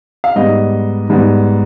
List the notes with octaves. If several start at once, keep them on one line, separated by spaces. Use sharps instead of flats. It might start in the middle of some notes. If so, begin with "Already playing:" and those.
F5
G#2 G3 B3 D#5
G#2 G3 B3